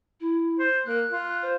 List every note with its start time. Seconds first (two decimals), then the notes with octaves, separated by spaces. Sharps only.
0.20 E4
0.59 C5
0.86 A#3 F#6
1.11 F4
1.42 C5